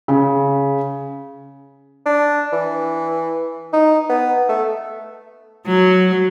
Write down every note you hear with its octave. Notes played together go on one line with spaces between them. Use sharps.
C#3
D4
E3
D#4
B3
A3
F#3